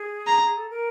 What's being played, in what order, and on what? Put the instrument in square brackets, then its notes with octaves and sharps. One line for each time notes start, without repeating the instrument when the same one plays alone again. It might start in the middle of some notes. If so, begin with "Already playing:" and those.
Already playing: [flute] G#4
[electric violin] A#5
[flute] G#4
A4
A#4